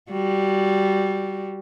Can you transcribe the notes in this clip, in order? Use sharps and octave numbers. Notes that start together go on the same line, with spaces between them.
G3 F#4